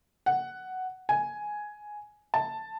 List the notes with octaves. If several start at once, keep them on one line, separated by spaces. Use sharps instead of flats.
F#5
G#5
A5